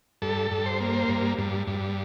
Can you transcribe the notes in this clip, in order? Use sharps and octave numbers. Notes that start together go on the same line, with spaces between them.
G2 A4
G2
C5
A#3
C5
G2
G2
G2